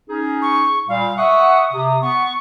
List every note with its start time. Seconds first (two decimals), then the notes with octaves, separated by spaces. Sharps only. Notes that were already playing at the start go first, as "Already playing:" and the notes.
0.09 C#4 D#4 G#4
0.42 C#6
0.88 A#2 G3 F5
1.17 E5 F#5 C#6 D#6
1.72 C3
2.01 B3 C#6